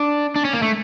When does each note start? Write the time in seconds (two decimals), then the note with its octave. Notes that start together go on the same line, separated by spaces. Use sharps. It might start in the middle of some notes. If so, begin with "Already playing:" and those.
Already playing: D4
0.36 D4
0.45 C#4
0.53 A#3
0.62 A3